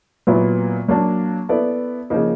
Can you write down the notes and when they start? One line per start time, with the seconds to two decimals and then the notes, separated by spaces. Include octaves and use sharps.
0.27 A#2 F#3 B3 E4
0.88 F#3 A#3 D4
1.49 B3 E4 A4 D5
2.10 C#3 F3 A#3 D#4